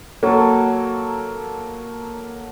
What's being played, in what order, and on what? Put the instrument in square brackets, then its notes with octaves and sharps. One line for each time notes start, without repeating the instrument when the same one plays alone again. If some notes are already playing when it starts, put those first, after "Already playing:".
[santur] F#3 A4 [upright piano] A#3